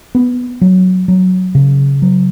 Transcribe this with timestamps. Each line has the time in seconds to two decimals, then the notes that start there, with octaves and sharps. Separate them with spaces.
0.15 B3
0.61 F#3
1.08 F#3
1.55 C#3
2.02 F#3